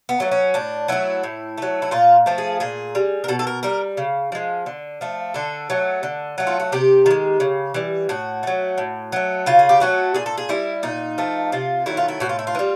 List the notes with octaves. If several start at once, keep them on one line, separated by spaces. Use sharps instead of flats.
B3
F#3 A3
C#4
A2 D4
F#3 A3 E4
A2
F#3 A3
E4
A#2 F4
F3 A3
G#4
A#2 G#4
G3
A#4
B2 A4
A4
A#4
G3 A#4
C#3
F3 G#3
D3
F3 A3
D3 A4
F#3 A3
D3
F#3 A3
F4
F#4
C3 G4
D#3 G#3
C#3
E3 G3
A2 F#4
F#3 A3
A2
F#3 A3
C#3 F4
G#4
G4
F#3 A3 F#4
A#2 G#4
A4
G#4
G3 E4
A#2 D#4
F3 A3
C3 F4
D#3 F#3 A3 E4
F4
E4
A2 F#4
F4
E4
F4
E3
G3